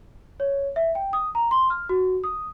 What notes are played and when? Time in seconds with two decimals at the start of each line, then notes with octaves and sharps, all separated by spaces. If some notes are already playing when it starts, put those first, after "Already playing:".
0.40 C#5
0.76 E5
0.95 G5
1.13 D#6
1.35 A#5
1.51 C6
1.70 F6
1.89 F#4
2.24 D#6